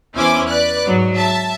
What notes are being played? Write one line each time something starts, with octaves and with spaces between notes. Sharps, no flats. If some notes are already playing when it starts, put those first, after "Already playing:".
E2 C#4 E4 C5 G#5 D6
B4 D5 F#6
G#2 F#3
E5 A5